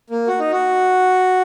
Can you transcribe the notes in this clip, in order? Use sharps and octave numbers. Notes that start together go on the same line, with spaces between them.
A#3
F#4
D#4
F#4